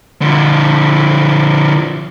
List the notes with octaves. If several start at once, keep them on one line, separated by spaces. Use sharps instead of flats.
D3 F3